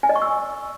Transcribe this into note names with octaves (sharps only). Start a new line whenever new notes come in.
G#5
D#5
C#6
E6